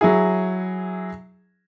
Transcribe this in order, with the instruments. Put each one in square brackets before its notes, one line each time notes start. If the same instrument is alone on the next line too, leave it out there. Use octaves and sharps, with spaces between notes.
[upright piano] F#3 E4 G#4